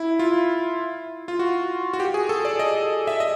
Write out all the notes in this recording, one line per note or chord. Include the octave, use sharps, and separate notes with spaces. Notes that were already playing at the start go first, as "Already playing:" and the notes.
Already playing: E4
F4
F4
F#4
F#4
G4
G#4
A4
D5
D#5
E5
D#5